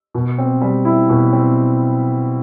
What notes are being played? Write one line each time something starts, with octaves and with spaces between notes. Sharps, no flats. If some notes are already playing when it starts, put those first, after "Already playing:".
B2
C4
G3
E4
B2
C4